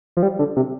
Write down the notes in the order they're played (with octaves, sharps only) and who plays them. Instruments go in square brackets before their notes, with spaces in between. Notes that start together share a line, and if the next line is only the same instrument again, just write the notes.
[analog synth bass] F3
G3
D3
C3